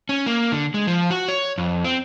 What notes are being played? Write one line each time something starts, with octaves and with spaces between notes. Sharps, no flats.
C#4
A#3
D3
G#3
F3
F#4
C#5
F2
C4